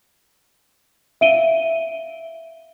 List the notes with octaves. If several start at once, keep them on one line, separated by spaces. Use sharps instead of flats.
E5 F5 D7 D#7 G7